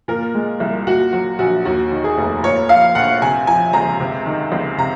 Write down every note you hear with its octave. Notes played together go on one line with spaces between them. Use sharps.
A#2 A#4
G#3
C2
A#2 F#4
F#3 F#4
A#1 F#4
D#2 F#4
D#3
G#4
F1
A#2 C#5
F3 F5
A#1 F#5
C3 G#5
F3 G#5
C#2 A#5
C3
D#3
C#2
C3 A#5